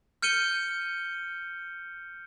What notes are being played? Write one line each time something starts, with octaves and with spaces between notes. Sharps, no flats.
F6 G6 C#7 D#7 G7